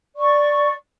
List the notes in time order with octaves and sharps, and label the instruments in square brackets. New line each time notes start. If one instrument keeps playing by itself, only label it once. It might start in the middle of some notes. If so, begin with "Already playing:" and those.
[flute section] D5 C#6